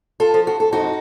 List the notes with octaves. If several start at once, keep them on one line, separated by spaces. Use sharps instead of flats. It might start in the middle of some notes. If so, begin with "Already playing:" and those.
F4 A4
F3
F#4
A4
F2 D#4 F#4